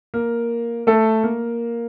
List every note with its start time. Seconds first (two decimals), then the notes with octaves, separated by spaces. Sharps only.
0.14 A#3 A#4
0.87 A3 A4
1.24 A#3 A#4